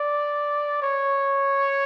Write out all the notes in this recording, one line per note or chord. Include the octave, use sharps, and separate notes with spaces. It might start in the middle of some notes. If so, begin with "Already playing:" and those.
Already playing: D5
C#5